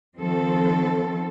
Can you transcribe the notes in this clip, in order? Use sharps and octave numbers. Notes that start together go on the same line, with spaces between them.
D#3 F3 C4 A4